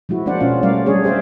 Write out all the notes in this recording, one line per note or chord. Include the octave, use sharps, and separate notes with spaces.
F3 G#3 E4 F#4
G#3 A#3 D4 C5 D5 F#5
B2 C#4 F4 F5
F#3 G3 A3 A#4 D5 F5
G3 A3 D4 G#4 C#5
G4 C5 D5 E5 F5